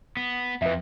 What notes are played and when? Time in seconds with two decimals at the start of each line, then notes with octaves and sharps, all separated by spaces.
0.17 B3
0.62 F2 B4 E5